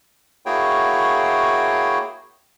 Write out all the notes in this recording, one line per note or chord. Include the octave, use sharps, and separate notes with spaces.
A#3 E4 F#4 G#4 C#5 G5